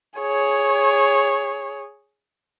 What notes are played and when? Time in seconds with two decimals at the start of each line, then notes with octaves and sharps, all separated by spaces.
0.20 G#4 C#5